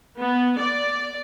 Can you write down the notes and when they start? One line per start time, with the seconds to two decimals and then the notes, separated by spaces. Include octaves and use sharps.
0.19 B3
0.60 D5